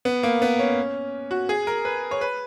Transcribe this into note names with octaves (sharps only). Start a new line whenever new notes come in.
B3
A#3
B3
C#4
F#4
G#4
A#4
B4
C#5
B4